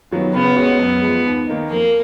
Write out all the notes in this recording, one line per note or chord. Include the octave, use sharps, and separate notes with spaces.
D#3 F#3 B3 F4
C#3 B3
G#3 C#4 F#4
F#2
F3 G#3
D#2
D#3 A#3 D#4
F2 A#3